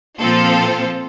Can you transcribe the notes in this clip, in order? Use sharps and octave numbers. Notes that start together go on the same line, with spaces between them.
A#2 F3 C4 F4 A4